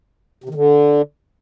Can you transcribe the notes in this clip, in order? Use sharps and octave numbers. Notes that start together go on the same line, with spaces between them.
C3
D#3
D3